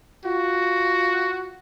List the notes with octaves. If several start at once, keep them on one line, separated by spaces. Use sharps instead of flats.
F4 F#4